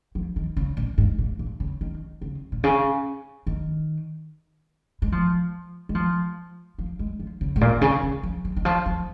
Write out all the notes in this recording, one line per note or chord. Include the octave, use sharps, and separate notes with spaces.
F3
D#3
C#3
A#2
G#2
A#2
A#2
C#3
D#3
C#3
A#2
C#3
D#3
G#3
F3
G#3
F3
F3
G#3
F3
C#3
G#2
A#2
A#2
C#3
C#3
F3
F3
D#3
F3
F3